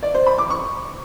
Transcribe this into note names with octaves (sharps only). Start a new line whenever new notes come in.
D5
C5
B5
D6
C#6